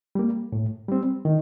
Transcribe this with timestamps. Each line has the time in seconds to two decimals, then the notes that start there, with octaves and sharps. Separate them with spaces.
0.15 G3 A#3
0.52 A2
0.89 G3 C4
1.25 D#3